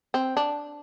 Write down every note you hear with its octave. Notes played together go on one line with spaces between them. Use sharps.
C4
D4